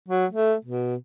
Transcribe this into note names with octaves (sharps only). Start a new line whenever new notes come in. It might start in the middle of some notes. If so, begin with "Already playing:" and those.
F#3
A3
B2